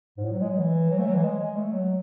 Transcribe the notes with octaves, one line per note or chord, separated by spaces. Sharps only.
G#2
A2
F#3
G#3
F#3
E3
F#3
A3
F#3
E3
G#3
G#3
A3
F#3